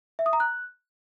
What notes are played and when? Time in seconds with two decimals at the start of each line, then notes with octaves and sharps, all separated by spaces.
0.19 E5
0.26 D#6
0.33 A#5
0.40 F#6